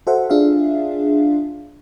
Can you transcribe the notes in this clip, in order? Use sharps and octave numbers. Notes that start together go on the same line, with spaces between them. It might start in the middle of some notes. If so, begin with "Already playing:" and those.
F#4 A4 C5 E5 F#5
D4 F4 G#4 E5 F5